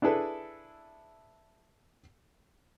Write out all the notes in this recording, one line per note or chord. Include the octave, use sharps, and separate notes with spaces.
D4 E4 G#4 A4 B4